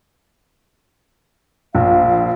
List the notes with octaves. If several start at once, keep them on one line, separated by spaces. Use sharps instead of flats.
A#1 F5